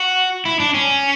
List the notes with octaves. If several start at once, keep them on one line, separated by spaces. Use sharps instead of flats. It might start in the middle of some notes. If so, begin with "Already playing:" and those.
Already playing: F#4
E4
D4
C#4